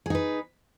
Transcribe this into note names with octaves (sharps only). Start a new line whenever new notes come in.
D#4 G#4 B4